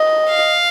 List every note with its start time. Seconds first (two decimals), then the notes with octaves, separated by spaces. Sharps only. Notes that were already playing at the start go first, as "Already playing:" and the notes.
Already playing: D#5
0.29 F5